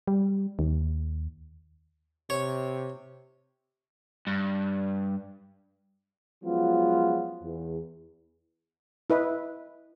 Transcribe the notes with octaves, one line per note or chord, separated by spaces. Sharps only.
G3
D#2
C3 C#5
G2
F3 F#3 G#3 B3 C#4 F4
E2
E4 B4 D#5